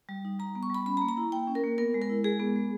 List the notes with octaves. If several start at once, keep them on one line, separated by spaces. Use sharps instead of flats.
G3
D#4
G3 A#5
B3
C#6
G3 B5
C#4 B5
A#5
A#3
A#5
E4
A#3 G5
C#4
A#4
A#3
B3 A#4
G#3
A#4
E4
G#3 G#4
B3
G#3